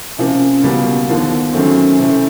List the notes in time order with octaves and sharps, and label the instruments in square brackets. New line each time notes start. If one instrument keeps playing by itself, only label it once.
[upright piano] C3 F3 A#3 [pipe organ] C#4
[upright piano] C#2 B2 G3 A#3 [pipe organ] B3
[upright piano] D#2 D3 F3 A#3 [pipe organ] B3
[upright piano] F#2 D#3 F#3 A3 C4 [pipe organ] C#4
[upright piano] C3 E3 A3 C4 E4